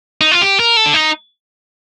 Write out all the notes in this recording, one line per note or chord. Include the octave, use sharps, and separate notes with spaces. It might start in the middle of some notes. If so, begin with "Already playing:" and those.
D#4
F4
G4
A#4
A4
D4
D#4